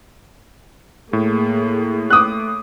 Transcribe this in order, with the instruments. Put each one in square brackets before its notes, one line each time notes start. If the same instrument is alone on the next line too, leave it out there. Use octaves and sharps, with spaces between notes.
[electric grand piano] A2 [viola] A#3 G#4
[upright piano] D6 D#6 F#6